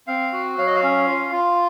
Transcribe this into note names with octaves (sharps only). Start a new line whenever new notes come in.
C4 F5
F#4
F#3 F5
D#5
F5
C#4
F4
F4